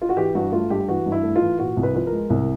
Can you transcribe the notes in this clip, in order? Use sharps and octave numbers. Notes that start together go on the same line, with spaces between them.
F4
F#4
E3 G4
G2 F#4
A3 F4
G2 G4
E3 F#4
G2
E4
A3
F4
E3
A#2 F#4
C2
B4
F3 B4
A#4
G#3
C2